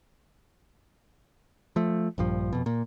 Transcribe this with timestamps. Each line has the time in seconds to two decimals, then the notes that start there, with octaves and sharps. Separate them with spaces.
1.76 F3 A3
2.18 A#1 G2 F3
2.53 F2 B2
2.66 A#2